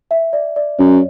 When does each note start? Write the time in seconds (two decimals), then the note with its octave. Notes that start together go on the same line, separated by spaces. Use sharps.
0.11 E5
0.33 D5
0.56 D5
0.79 F#2 C#5